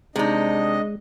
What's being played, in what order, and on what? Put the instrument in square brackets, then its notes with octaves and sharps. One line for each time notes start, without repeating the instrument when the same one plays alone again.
[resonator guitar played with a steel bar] C3 D#4 [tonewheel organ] G#3 [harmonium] D4 D#5